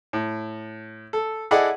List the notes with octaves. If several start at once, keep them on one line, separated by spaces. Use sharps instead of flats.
A2
A4
E4 G#4 A4 D5 D#5 F#5